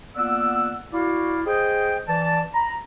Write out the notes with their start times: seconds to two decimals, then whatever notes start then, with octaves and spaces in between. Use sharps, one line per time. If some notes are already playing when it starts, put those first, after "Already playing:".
0.16 A#3 B3 F4 D5 F#5 E6
0.93 E4 F#4 D5 F5
1.46 G#4 C5 D#5 G5
2.08 E3 D5 A5
2.54 A#5 B5